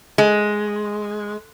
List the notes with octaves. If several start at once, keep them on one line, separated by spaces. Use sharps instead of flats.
G#3